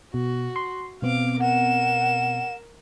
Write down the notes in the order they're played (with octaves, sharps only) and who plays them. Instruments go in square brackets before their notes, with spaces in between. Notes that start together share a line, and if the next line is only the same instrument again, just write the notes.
[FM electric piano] B2 [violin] F#4
[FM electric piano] C6
[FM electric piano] B2 B3 C4 [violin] F5 D6
[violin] A#4 E7 [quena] F#5